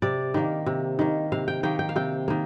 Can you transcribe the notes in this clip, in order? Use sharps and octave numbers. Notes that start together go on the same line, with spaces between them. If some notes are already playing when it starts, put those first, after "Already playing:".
C3 D5
D#3 A#3
C3
D#3 A#3
C3 F5
G5
D#3 A#3 G5
G5
F5
C3 G5
D#3 A#3